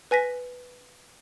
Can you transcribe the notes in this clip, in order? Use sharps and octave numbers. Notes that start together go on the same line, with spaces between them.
B4 G#5 A#6 B6